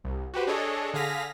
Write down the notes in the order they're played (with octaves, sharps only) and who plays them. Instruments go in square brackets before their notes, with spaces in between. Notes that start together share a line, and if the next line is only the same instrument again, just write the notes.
[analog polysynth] C2
F#4 G4 B4 C5
D4 G#4 A4 C#5 D#5
D3 G#4 F5 A#6 B6